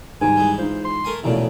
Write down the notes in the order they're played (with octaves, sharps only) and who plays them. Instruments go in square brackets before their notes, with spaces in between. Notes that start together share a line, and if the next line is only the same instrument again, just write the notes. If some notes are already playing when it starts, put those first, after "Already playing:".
[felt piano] G#2 D#3 G3 [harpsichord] C3 [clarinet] G#5
[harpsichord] E3 G#3
[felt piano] D#4 F4 [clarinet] C5
[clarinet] C6
[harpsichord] A3 A#4 G#5
[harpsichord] B1 A#2 C#3 [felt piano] E3 A3 [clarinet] F3